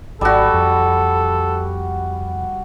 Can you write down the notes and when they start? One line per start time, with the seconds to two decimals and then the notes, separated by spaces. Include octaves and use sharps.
0.21 G#1 G3 F#4 A4
0.54 F2